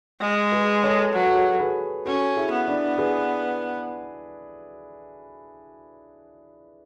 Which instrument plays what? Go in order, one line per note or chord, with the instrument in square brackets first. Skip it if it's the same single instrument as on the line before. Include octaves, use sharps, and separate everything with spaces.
[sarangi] G#3
[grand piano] G#4 B4
A4 C#5
[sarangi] F#3 [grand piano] B4
[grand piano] A4
G#4
F#4 A4
G#4 B4
[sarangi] C#4 [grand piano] F#4 A4
[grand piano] E4 G#4
[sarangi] B3
[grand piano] D4
G#4 B4